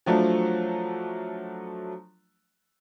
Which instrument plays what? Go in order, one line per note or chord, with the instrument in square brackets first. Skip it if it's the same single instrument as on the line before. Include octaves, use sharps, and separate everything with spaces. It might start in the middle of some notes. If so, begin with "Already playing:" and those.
[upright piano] F3 F#3 A3 D4